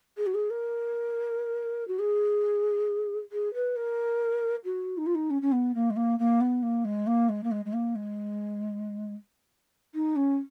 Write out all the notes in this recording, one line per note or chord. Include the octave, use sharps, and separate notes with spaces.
G#4
F#4
G#4
A#4
F#4
G#4
G#4
B4
A#4
F#4
D#4
F4
D#4
C#4
C#4
B3
A#3
G#3
A#3
A#3
B3
A#3
G#3
A#3
G#3
A#3
G#3
G#3
A#3
G#3
D#4
C#4